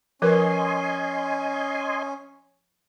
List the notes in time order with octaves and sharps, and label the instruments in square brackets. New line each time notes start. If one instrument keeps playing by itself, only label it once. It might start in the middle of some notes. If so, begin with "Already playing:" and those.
[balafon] F3 A#4 B4 [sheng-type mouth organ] C#4 [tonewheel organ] D#5 G#5 C6